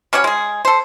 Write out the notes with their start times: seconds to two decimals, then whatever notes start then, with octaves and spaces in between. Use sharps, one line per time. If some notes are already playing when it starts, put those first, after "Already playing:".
0.13 G3 C#4 F#4 C#5
0.24 G#3 G#4
0.65 A4 C5